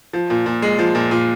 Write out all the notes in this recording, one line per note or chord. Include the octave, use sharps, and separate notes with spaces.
F3
A#2
A#2
G#3
F3
A#2
A#2